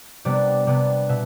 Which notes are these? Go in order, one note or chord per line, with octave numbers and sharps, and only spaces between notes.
C3 G3 B3 D4 D5
C3 G3 B3 D4 D5
B2 E5